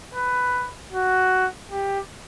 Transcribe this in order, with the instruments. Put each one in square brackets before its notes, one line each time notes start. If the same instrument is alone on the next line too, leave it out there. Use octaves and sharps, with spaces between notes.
[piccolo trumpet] B4
F#4
G4